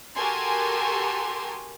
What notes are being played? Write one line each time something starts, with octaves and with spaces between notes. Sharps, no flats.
F#4 G4 A4 A#4 G#5 C6